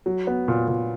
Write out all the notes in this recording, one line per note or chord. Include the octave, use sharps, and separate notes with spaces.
F#3
B3
A#2
A#2